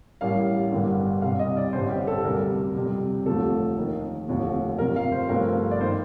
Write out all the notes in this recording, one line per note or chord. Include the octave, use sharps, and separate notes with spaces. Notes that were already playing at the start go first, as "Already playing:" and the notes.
A1 A2 G3 A#3 F5
G1 G2 D3 G3 A#3
C2 C3 G3 F5
D#5
D5
A1 G2 D3 C5
G4
A4
D2 C3 G3 A#3 A#4
F2 C3 G3
F1 D#2 D3 F3 A3 A4
D#2 D#3 A#3
F1 D#2 D3 F3 A3
G1 F2 C3 F3 A#4
F5
C5
G1 G2 F3 A3 A#4
D5
D#3 A#3 C5